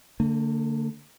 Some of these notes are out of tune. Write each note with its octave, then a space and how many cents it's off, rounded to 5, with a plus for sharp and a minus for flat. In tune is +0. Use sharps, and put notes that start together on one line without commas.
D3 -10 A#3 -45